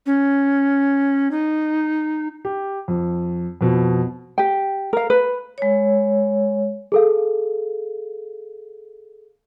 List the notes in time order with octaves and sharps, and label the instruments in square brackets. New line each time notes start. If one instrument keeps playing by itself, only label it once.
[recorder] C#4
D#4
[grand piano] G4
F2
F2 B2
[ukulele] G4 G5
A#4 F5
B4
[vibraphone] G#3 C#5
[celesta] G#4 A4 F5